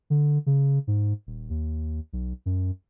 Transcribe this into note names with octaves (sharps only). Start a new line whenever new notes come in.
D3
C#3
G#2
D#1
D#2
B1
F#2